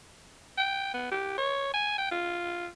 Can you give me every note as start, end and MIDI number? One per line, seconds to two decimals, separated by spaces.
0.58 0.90 79
0.94 1.09 59
1.11 1.35 67
1.38 1.73 73
1.73 1.94 80
1.98 2.10 79
2.11 2.67 65